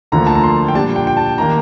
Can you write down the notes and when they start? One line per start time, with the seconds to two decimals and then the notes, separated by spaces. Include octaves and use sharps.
0.12 D2 D3 F3 A#3 A#5
0.27 A5
0.35 A#5
0.43 C6
0.68 G5
0.75 A#2 G3 D4 A5
0.96 G5
1.07 G5
1.17 A5
1.38 D#3 A#3 D4 A#5